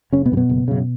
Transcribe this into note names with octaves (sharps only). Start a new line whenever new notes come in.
F#1 C#3 C#4
B2 B3
F#2 C#3
B2 B3
F#1
F#2 C#3